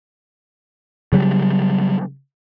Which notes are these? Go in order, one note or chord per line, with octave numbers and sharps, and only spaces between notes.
C#3 F#3 G3